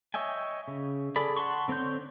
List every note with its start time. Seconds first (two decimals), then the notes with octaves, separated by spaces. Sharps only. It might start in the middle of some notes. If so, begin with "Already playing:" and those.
0.14 C#5 D#5 E5 G5 G#5
0.68 C#3
1.16 G#4 A4 D5 B5
1.37 F#5 A5 C6 C#6
1.68 D3 C4 C#5 C6 G6